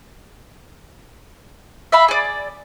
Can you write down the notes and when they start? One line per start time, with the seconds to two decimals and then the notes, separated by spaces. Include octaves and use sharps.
1.92 E5 F5 B5
2.08 G#4 D5